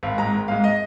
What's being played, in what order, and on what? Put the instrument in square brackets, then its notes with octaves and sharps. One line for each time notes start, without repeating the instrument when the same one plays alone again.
[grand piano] G#1 F5
G#2 G#3 A#5
G#1
G#2 G#3 F5
D#5